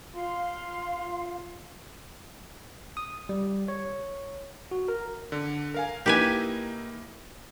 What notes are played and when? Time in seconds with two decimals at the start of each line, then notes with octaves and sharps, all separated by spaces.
0.15 F4 F5 C6
2.97 D#6
3.29 G3
3.68 C#5
4.71 F#4
4.88 A#4
5.32 D3
5.74 A#4 F5 G#5
6.06 A#3 D#4 E4 G4 B4 G#5